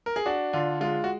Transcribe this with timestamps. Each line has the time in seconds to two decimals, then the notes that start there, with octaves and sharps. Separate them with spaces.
0.06 A#4
0.16 G#4
0.26 D4 F#4
0.53 D3 F4
0.81 G#3 F4
1.04 F#4